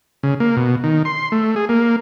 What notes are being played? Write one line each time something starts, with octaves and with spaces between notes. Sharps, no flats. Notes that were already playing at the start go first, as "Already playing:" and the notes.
C#3
A#3
B2
D#3
C6
A3
G#4
A#3